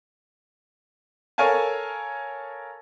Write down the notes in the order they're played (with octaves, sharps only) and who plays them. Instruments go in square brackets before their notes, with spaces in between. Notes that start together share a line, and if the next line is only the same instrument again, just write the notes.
[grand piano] A4 A#4 C#5 F5 G#5 A5